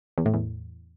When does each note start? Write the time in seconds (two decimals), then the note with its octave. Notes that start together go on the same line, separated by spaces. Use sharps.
0.18 E2
0.26 A2
0.34 E2